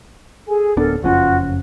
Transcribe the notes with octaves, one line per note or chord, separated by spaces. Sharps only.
G#4 A4 G#5
D1 B3 D4 A4 A#4
F#1 F2 C#4 F4 F#4